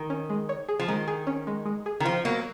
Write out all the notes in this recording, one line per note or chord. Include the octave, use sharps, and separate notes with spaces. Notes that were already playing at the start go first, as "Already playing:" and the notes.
Already playing: D#3
C#4
G#3
C#5
G#4
F3
D#3 G#3
G#4
C#4
G#3
G#3
G#4
D#3
F3 F4
F#3 A#3 B3